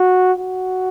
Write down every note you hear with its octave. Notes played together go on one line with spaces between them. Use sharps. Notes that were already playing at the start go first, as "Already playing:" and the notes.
Already playing: F#4
F#4